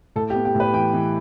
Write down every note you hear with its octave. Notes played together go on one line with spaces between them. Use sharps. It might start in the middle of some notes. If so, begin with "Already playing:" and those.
A2 A4
G4
B3
G4
A2
B4
E3 G5
E3